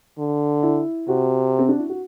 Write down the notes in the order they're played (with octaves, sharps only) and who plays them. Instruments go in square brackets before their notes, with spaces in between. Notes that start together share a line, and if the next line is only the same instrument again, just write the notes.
[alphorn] D3
[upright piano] E4
[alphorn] C3 [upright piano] F#4
[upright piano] C4
D4
E4
F#4